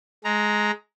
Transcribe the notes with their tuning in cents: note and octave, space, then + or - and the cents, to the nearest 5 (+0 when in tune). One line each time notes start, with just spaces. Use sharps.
G#3 +15 A#5 +0